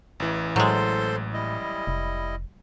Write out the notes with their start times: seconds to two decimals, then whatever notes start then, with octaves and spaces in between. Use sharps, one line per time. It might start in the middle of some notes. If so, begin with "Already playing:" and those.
0.20 A1 E3
0.56 A2 F#3 G#3 A4 C5 C6
1.34 G3 E4 D#5
1.87 F1